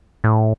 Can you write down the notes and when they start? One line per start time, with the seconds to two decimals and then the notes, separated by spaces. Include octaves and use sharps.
0.24 A2